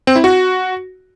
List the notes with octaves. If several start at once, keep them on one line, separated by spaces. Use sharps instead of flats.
C4
E4
F#4